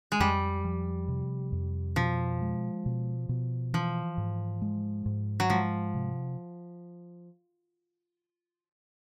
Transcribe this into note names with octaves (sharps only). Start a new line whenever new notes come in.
G#3
F2 G3
F3
C3
F2
B2 F3
G#3
B2
B2
E3 F3
G#2
G#3
G#2
F#3
F3 G#3
C3